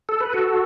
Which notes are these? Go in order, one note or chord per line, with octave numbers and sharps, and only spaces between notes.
A4
B4
F#4 A4